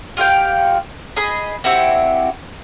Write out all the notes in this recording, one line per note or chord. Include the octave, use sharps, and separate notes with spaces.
F4 G4 F5 G5
G#4 D#5 B5
C4 E4 F#4 G4